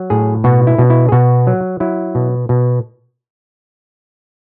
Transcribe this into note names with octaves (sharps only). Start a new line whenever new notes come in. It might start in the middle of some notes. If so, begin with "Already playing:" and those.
Already playing: F#3
A2 G#4
B2 F#4
E4
B2
E4
G#4
B2 F#4
F#3
F#3 E4
B2
B2